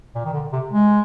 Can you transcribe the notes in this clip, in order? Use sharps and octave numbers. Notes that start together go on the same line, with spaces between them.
A#2
D#3
D3
C3
G#3